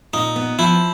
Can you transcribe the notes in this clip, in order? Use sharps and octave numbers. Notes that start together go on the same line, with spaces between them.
A#2 D#4
B3
F3 E4